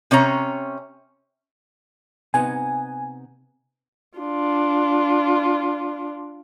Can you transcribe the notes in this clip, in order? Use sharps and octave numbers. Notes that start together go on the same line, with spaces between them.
C3 C#4 C#5 A#5
C3 B3 D#4 G#5
D4 F4